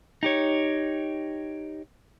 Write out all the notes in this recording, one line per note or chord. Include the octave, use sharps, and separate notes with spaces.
D#4 G4 C#5